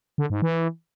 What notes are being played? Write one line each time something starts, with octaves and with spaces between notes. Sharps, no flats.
D3
G#2
E3